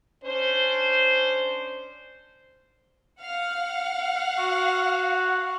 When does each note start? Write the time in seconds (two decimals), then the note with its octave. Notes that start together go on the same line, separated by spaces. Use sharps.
0.23 C#4 D4 C5
3.22 F5 F#5
4.39 F#4